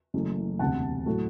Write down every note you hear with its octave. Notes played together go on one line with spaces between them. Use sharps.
F#1 F#2 E3 A3
E1 D2 C3 F#5 A5
A2 F#3 A3